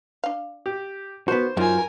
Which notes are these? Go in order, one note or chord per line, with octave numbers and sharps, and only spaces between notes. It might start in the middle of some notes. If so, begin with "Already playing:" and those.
D4 F5
G4
D#3 F3 B3 F#4 C5
F#2 F#3 D#4 F4 A#4 E5 G#5